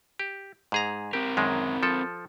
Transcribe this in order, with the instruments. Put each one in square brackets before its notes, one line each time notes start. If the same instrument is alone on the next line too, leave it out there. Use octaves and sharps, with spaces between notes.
[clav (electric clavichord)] G4
G#2 G#4 A#5
[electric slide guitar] C4 A#4 [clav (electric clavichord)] G4
[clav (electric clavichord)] F#2 D#3 G#3
F3 A4